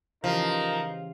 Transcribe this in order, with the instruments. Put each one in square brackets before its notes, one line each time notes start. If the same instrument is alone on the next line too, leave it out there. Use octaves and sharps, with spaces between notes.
[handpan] C#3 E3 G4 [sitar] F3 [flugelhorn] D#4 [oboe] A#4